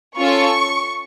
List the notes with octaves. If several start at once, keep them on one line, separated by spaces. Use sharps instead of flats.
C#4 F4 A4 C#6